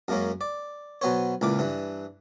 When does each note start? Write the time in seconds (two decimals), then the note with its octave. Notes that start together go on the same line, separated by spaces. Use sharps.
0.08 F#2 G#3 A#3 C#4
0.41 D5
1.01 B2 F#3 B3 C5 C#5
1.41 C#2 A#2 E3 D6
1.59 G2 E3